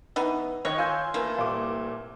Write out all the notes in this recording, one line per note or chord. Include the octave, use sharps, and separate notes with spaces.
E3 B3 D#4
D#3 C#5 D#5 F#6
F4 G#5 E6 G6
E3 A3 A#3
C2 A#2 D6